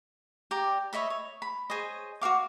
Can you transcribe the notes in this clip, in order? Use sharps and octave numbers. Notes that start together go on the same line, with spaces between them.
G4 D5 A#5
C#5 D#5 E5 B5
C#5
B5
G#4 C5 C#5 D#5
F#4 C#5 F5 D6